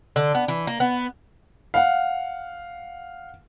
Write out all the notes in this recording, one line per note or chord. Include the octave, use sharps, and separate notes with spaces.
D3
B3
E3
A#3
B3
F5 F#5